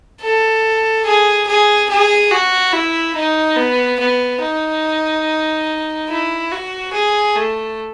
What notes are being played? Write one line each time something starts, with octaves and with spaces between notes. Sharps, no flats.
A4
G#4
G#4
G#4
F#4
E4
D#4
B3
B3
D#4
E4
F#4
G#4
A3